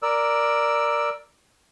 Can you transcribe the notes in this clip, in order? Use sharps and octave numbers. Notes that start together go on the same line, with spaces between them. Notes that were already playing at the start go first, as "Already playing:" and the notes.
A#4 D5 E6